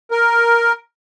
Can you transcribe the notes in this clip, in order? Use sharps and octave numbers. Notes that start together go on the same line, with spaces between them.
A#4